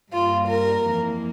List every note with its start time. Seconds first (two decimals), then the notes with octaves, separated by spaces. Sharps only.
0.12 G2 G3 A#3 F4
0.47 A#4
0.82 F2 E3 A#3